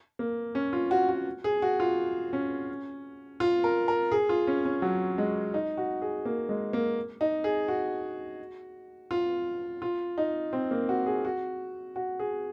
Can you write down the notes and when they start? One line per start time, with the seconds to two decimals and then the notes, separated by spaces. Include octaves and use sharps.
0.19 A#3
0.55 C#4
0.73 F4
0.91 F#4
1.09 F#4
1.44 G#4
1.62 F#4
1.80 F4
2.33 C#4
3.40 F4
3.64 A#4
3.88 A#4
4.12 G#4
4.29 F4
4.47 C#4
4.65 C#4
4.82 F#3
5.18 G#3
5.54 D#4
5.77 F#4
6.02 G#4
6.25 A#3
6.49 G#3
6.73 A#3
7.21 D#4
7.44 G#4
7.68 F#4
9.11 F4
9.82 F4
10.18 D#4
10.53 C4
10.71 A#3
10.89 F#4
11.06 G#4
11.25 F#4
11.96 F#4
12.19 G#4